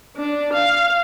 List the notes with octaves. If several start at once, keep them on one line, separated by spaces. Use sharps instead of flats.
D4
F5